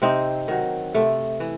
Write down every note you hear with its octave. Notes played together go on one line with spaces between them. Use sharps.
C3 C4 D#4
D#3 F#3
C3 A3
E3